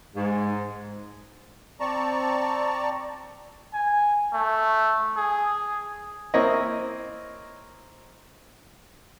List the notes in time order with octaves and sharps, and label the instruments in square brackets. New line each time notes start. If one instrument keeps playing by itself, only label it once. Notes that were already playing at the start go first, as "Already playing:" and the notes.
[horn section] G#2
[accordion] C4 D5 A5 A#5 C#6
[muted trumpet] G#5
A3
G#4
[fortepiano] A#3 C4 E4 C#5 D#5